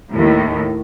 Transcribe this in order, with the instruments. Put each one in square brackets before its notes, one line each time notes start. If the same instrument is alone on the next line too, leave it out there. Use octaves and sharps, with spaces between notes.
[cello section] D#2 A2